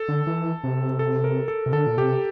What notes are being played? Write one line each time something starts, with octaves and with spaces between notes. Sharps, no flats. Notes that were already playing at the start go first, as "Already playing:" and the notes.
Already playing: A4
D3
E3
C3
A4
A#4
A4
C3
D3 A4
A#2
C3 G4